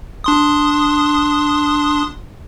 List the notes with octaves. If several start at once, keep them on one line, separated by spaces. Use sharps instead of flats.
D4 C6 D#6